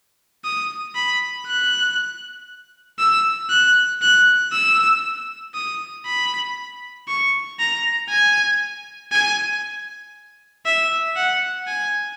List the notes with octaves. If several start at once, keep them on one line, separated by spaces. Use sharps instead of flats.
D#6
B5
F#6
E6
F#6
F#6
E6
D#6
B5
C#6
A#5
G#5
G#5
E5
F#5
G#5